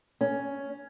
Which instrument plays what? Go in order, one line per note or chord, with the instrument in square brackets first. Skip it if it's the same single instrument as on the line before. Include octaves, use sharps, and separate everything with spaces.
[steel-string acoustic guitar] C#4